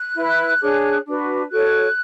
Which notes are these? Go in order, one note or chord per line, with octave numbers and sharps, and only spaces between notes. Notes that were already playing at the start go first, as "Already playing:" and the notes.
Already playing: F#6
E4 B4
D4 G#4 C#5
D4 F#4 B4
F#4 A4 C#5 F#6